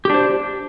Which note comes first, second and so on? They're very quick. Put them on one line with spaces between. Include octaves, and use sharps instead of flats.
G4 D4 C5